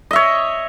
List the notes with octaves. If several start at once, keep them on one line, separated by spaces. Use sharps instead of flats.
C#5 D#5 E5